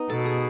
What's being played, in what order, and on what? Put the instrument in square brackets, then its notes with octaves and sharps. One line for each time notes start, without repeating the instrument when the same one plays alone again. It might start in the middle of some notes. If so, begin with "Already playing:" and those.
Already playing: [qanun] B3 D#4
[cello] B2 [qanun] A4
[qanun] G#4